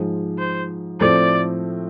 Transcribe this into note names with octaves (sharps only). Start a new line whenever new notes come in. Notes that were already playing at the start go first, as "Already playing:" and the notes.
Already playing: G#2 F3 G#3
C5
A2 F3 A3 C4 D5